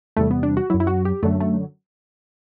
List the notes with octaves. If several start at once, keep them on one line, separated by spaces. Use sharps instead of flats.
E2 C3 G3 A3
B3
D4
F#4
F#2 F#3 E4
E4
F#4
G4
F#2 D3 F#3 A3
A3